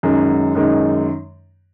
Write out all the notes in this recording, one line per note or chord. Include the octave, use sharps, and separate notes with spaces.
F#2 D#3 G#3
F#2 D#3 G#3